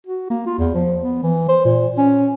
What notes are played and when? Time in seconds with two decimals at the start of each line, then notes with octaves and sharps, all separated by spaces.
0.07 F#4
0.30 A#3
0.47 F4
0.58 E2
0.74 F3
1.02 B3
1.23 E3
1.49 C5
1.65 A#2
1.98 C#4